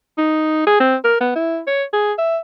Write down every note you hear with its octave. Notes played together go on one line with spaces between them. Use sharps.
D#4
G#4
C4
A#4
B3
E4
C#5
G#4
E5